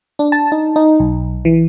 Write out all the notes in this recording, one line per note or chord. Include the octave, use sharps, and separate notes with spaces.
D4
A5
D#4
D#4
B1
E3